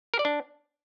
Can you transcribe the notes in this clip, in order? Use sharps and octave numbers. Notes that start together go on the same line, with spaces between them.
A#4
D5
D4